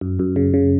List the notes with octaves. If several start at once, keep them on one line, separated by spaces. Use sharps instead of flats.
F#2
F#2
C#3
C#3